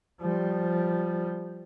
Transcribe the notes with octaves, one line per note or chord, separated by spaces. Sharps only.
F3 G3